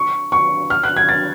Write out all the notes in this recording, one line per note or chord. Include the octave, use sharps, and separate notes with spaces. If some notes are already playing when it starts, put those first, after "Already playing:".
Already playing: C#6
C#6
F6
F#6
G#6
A6